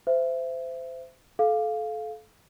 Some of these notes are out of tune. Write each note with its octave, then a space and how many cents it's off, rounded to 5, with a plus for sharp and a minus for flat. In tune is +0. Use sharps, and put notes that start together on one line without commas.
C5 -25 E5 +20
A4 -25 F5 +0